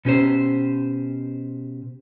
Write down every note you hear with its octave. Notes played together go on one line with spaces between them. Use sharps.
B2 C#4 G4 C5